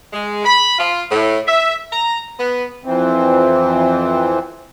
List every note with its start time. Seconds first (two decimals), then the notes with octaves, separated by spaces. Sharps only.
0.13 G#3
0.45 B5
0.79 F4
1.10 A2
1.47 E5
1.92 A#5
2.38 B3
2.85 F2 E3 C4